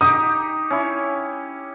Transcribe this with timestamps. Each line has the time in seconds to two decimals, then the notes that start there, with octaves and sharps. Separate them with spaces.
0.01 D#4 G4 D#6
0.70 C#4 E4